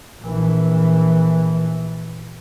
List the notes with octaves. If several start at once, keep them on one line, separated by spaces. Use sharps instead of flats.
A#1 E3